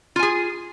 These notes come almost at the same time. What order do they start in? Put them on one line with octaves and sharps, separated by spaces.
F4 G#5 G#4